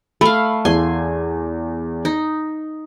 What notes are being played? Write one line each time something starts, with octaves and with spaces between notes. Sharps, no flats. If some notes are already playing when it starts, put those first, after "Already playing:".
A3 F5 B5
E2 G#5 C6
D#4